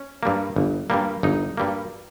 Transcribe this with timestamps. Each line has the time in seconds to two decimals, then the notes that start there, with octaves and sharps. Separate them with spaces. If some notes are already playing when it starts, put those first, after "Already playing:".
Already playing: C#4
0.23 G2 G3 A#3
0.56 G1
0.90 G2 G3 A#3
1.23 G1 D#4
1.57 G2 G3 A#3